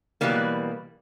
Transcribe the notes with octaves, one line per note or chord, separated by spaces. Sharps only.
B2 E3 F#3 G3 A#3